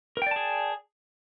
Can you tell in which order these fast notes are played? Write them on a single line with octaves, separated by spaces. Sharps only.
A#4 G5 D5 A5 G#4